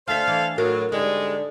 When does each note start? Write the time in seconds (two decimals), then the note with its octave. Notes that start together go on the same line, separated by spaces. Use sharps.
0.08 D2 A4 C5 E5 F5
0.27 E3
0.58 A2 F#3 A#4
0.92 G#2 D3 G3 G#3